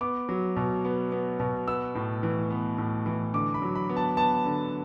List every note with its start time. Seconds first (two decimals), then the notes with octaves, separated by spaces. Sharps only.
0.01 B3 D6
0.29 F#3
0.56 B2
0.85 B3
1.12 B3
1.40 B2
1.67 B3 E6
1.95 A2
2.23 E3
2.50 B3
2.78 A2
3.06 E3
3.34 D3 D6
3.54 B5
3.62 F#3
3.75 B5
3.89 B3
3.97 A5
4.17 B3 A5
4.45 D3